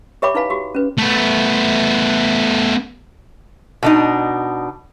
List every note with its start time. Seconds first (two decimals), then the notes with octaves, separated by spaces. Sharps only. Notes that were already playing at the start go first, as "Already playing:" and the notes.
0.22 G4 C#5 E5 G5 B5 D6
0.35 D#4 E4 B4 F5 G#5 B5
0.50 F#4 G4
0.75 C#4 B4
0.98 A3 B3
3.83 B2 D4 D#4